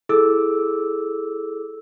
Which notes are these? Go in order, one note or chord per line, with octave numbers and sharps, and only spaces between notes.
E4 G#4 A4 D6 E6